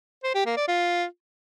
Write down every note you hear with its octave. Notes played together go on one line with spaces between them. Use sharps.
C5
G4
A#3
D5
F4